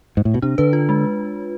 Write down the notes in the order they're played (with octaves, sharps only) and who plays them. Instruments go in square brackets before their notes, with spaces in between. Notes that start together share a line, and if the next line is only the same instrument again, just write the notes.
[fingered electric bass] G#2
A2
B2
[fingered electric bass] C3 [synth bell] D4
[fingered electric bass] D3 [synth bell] B4
[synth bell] F4
G#3